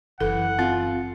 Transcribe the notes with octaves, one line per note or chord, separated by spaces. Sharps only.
F#1 E3 A4 F#5
C4 F4